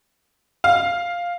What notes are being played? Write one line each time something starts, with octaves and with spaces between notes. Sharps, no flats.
F5